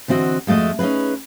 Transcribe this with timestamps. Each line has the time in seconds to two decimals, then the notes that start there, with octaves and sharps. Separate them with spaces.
0.08 D3 E3 C4 F#4 D#5
0.47 F2 G#3 A3 F#4 D#5
0.79 C#4 D#4 F#4 G#4 B4